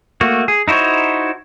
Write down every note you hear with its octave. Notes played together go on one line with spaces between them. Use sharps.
A3 A#3 F#4
G#4
D#4 E4 F#4 C5 C#5